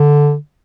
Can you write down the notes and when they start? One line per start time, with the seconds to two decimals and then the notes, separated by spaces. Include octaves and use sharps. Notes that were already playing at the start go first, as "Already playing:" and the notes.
Already playing: D3